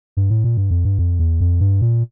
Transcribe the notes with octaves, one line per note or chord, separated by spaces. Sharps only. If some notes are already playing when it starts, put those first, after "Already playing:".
G2
A2
A#2
G2
F2
G2
F2
E2
F2
G2
A#2